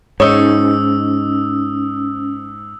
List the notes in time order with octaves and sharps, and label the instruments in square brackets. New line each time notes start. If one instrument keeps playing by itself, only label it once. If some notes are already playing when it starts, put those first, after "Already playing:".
[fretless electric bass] G#2 [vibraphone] C#4 [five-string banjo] D#4 C#5 [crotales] D#6 E6